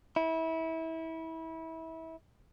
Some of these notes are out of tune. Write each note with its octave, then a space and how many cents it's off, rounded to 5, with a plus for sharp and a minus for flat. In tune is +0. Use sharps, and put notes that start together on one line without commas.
E4 -25